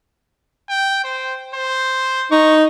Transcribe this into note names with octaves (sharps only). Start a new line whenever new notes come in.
G5
C5
C5
D#4 C#6